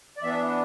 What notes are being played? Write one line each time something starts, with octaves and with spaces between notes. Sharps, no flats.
D5
E3 B3 D4 E5